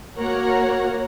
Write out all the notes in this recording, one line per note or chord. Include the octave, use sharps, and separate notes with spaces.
A#3 F#4 A#4 C#5 F#5 A#5